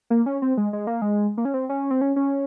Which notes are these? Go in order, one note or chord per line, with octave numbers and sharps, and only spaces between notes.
A#3
C#4
C4
G#3
G#3
A#3
G#3
A#3
C#4
C4
C#4
C4
C#4
C#4